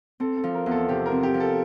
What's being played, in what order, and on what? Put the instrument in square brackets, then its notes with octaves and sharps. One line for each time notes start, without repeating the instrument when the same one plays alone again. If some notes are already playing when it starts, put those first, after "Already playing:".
[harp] C4 [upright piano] A4
[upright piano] A4
[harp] F3
[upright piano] A#4
[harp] E2
[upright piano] A4
[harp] C3 [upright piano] G4
[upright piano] A#4
[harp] C4
[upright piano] G4
[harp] F3
[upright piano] A4